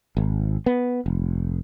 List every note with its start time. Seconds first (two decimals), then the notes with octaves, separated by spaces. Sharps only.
0.17 G#1
0.66 B3
1.06 F1